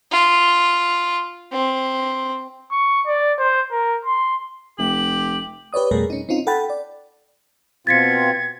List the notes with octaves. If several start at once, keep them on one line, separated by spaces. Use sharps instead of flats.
F4
C4
C#6
D5
C5
A#4
C6
F1 G4 F#7
G4 B4 C#5 D5 D#6
F2 B2 G3 A3 G#4 A#4
C#4 D#4
C4 C#4 D#4 F4
A4 F#5 G5 B5 A6
D5
B2 C4 F4 G#6 A6 B6 C#7